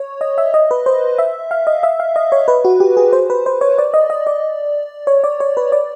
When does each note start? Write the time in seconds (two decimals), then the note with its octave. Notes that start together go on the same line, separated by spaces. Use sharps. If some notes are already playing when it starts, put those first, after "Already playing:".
Already playing: C#5
0.21 D#5
0.38 E5
0.54 D#5
0.71 B4
0.86 C5
1.18 E5
1.51 F5
1.67 D#5
1.83 E5
2.00 F5
2.16 D#5
2.32 C#5
2.48 B4
2.65 F#4
2.80 G4
2.97 G#4
3.13 C5
3.30 B4
3.46 C5
3.61 C#5
3.78 D5
3.94 D#5
4.10 D#5
4.27 D5
5.07 C#5
5.24 D5
5.40 C#5
5.57 B4
5.72 D5